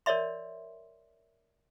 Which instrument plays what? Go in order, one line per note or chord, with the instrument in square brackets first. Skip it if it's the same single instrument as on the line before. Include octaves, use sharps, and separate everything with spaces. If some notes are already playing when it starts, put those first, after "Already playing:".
[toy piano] A#4 C#5 D5 E5 C6